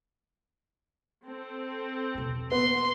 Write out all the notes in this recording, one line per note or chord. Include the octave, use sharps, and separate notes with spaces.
C4 A4
E2 B2
A#3 B3 C#4 C6